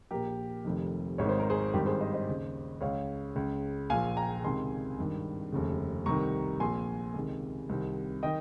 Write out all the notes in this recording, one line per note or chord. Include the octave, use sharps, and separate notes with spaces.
A#1 A#2 G4 A#4
F1 F2 C3 D#3
G#1 G#2 D#3 C#5
C5
A#4
G#4 C5
G#1 G2 D#3 G4 A#4
G#4 C5
C5 D#5
C5 D#5
D#2 C#3
C#2 C#3 C#5 F5
C#2 C#3
A#1 A#2 F5 G#5
G5 A#5
C#2 C3 D#3 G#5 C6
G#1 G2 D#3
F1 D#2 C#3
C2 C3 D#3 A#5 C#6
A#1 A#2 G#5 C6
C#2 C3 D#3
C2 C3 D#3
D#3 D#5 G5